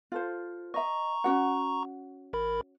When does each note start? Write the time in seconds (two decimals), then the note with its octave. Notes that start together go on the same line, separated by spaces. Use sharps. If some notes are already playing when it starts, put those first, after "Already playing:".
0.12 F4 A4 C5
0.74 D#5 E5 A#5 C#6
1.24 C#4 F#4 F#5
2.33 A1 A#4 B5